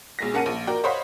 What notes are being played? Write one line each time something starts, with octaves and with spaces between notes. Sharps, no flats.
B1 G#3 A#6
A#3 C#4 F#5 A5 C#7 D#7
A#1
F#4 A#4 D5 G5
C5 C#5 D#5 F5 F#5 B5